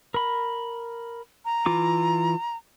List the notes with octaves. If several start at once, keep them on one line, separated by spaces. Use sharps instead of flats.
A#4 B5
A#5
E3 F4 D6